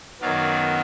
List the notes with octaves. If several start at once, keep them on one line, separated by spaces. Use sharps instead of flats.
F#2 D#3 F#3 B3 D5 F5